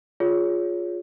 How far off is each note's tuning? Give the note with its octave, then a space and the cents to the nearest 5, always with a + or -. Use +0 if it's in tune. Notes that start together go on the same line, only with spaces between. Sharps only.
F4 +15 G#4 +0 C#5 +20